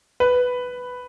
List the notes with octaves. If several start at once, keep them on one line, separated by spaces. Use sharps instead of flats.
B4